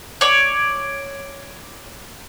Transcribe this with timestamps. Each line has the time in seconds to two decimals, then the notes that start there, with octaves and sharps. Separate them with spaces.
0.21 C#5 D5